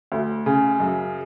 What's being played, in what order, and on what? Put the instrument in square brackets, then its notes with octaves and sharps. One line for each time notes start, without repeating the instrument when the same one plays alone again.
[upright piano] D2
C#3
F#2